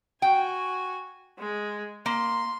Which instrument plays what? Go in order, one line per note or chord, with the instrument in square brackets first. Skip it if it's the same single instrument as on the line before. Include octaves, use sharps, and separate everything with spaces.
[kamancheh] F#4 G#5 [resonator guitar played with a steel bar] G5
[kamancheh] G#3
[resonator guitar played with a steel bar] A#3 [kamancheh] C6